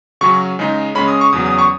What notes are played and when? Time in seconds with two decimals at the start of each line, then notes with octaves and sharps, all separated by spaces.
0.21 C#3 F#3 C#4 C#6
0.59 C#3 G#3 D#4
0.95 C#3 G#3 C#4 B5
1.08 D#6
1.21 C#6
1.33 E2 C#3 F#3 C#4 D#6
1.46 D#6
1.59 C#6